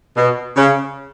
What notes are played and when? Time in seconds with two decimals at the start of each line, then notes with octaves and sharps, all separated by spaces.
0.16 B2
0.56 C#3